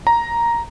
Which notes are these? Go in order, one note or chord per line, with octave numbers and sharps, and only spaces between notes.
A#5